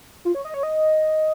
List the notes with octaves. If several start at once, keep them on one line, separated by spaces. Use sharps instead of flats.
F4
C#5
D#5
C#5
D#5